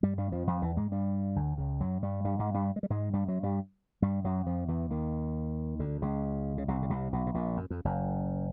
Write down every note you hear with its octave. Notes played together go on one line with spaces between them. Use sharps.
G2 G3
G2 G3
F2 F3
F2 F3
E2 E3
G#2 G#3
G2 G3
D2 D3
C#2 C#3
F#2 F#3
G2 G3
G2 G3
G#2 G#3
G2 G3
G#3
G3
G#2 G#3
G2 G3
F#2 F#3
G2 G3
G2 G3
F#2 F#3
F2 F3
E2 E3
D#2 D#3
D2 D3
C#2 C#3
C#3
C2 C3
C#3
C2 C3
B1 B2
B2
A#1 A#2
F#2
F2
F#1 F#2